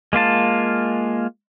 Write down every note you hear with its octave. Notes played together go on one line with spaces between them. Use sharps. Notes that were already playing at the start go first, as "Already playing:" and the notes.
G#3 A#3 F4 A5